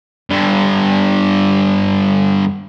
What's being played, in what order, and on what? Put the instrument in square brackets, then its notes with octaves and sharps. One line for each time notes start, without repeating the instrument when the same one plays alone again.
[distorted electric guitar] G2 D3